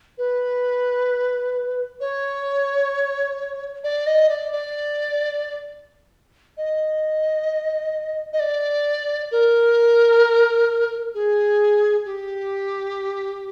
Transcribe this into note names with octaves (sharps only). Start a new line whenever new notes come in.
B4
C#5
D5
D#5
D5
D5
D#5
D#5
D5
A#4
G#4
G4